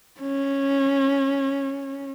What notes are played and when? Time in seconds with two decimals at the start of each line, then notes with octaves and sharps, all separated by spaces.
0.20 C#4